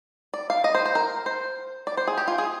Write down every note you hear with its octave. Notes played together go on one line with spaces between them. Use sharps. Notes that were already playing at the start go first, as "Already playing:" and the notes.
D5
F5
D#5
C5
C5
A#4
C5
D5
C5
G#4
G4
F4
G#4